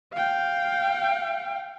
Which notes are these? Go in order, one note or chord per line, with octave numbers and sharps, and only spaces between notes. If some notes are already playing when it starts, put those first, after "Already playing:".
F5 G5